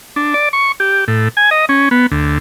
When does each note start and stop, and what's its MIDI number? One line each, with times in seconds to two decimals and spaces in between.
0.16 0.34 62
0.34 0.49 74
0.53 0.72 85
0.80 1.05 67
1.08 1.28 45
1.37 1.50 80
1.51 1.65 75
1.69 1.89 61
1.91 2.06 59
2.11 2.38 38